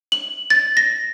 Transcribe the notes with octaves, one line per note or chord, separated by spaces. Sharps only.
F#7
A6
A#6